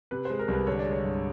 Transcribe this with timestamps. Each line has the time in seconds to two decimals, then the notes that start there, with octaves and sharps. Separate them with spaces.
0.11 C3 B4
0.25 G#3 C5
0.39 A#4
0.48 C2
0.53 B4
0.67 D3 C#5
0.79 D5
0.86 G#3
0.92 C#5
1.04 G2